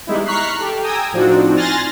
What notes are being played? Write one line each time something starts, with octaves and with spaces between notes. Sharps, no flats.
E3 G3 G#3 B3 D#4 E4
A#5 C#6 F6 F#6 B6 C7
G4 A4
G5 G#5 A#5 D#6 E6
A2 F3 C4 D4 D#4 F#4
G#5 C6 F6 F#6 A6 A#6